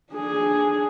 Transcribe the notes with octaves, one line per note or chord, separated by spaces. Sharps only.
D4 G#4